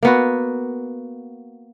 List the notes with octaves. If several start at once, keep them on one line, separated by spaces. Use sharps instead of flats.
A#3 B3 F#4